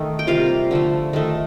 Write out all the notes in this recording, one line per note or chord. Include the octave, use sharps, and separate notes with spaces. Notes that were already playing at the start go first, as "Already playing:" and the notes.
Already playing: D#3 A3 D#4
G5
C3 G3 A#3 F4 F5
D3 F3 A3
D#3 A3